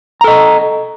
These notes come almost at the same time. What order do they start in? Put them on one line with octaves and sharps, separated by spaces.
A#5 A4 D#5